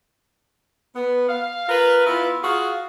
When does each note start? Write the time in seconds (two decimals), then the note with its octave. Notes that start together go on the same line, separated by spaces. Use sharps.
0.96 B3
1.29 F5
1.69 F4 A#4 B4
2.07 B3 E4 F4
2.44 F4 F#4 G#4 F5